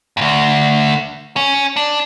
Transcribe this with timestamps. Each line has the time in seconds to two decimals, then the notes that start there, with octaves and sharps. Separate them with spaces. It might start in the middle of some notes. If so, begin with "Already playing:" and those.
0.17 D2 G2
1.36 C#4
1.76 D4